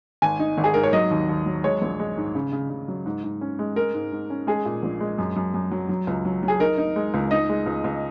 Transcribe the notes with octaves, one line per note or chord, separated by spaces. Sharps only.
G#1 G#5
D#4
G#1
G#4
G#2 A#4
C#5
F#3 D#5
D#2
D#2
F#3
G#3 C#5
A#1
G#3
G#2
C#3
C#3
C#3
F#3
G#2
G#2
C#4
G#3
G#3 A#4
G#2
G#2
C#4
G#3 G#4
A#2
A#1
G#3
F#2
F#2
F#2
F#3
F#3
C#2
F#3
F#3
G#4
D#4 A#4
D#4
G#3
C#2
D#4 D#5
G#3
C#2
C#2